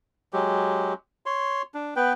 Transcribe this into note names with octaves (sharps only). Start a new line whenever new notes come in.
F#3 G#3 G4
C#5 C6
D4
B3 B4 G5